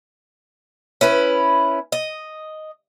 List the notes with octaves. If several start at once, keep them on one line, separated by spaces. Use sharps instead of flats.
C#4 E4 B4
D#5